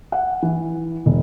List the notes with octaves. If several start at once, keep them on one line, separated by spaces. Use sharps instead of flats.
F#5
E3
E1